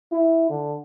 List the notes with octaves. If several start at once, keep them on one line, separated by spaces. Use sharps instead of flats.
E4
D3